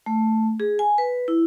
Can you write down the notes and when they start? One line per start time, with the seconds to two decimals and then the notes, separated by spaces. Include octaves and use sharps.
0.06 A3
0.60 G#4
0.79 G#5
0.98 B4
1.28 E4